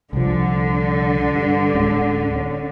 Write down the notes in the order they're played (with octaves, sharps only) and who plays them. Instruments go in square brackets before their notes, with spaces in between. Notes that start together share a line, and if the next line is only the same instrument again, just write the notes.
[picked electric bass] C2 F3 [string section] D3
[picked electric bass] G2
D1 G#3 C#4
C#4